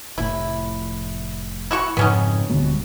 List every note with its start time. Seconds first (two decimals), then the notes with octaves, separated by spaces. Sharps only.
0.18 F1 A2 E4
1.71 E4 F#4 C#6
1.97 F2 G#2 C#3 B3 C#4 D#4
2.50 D1 B2 D3 G3 G#3